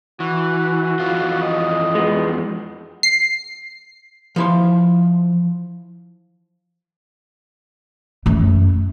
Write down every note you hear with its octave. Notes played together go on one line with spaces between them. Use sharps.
E3 F#4
F2 E3 F4
D#5
G#3 B3
C7
F3 E4 C6
F#2 A3